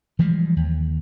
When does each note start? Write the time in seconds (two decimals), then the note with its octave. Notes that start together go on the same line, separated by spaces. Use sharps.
0.19 E3 F3 G3 G#3
0.56 D#2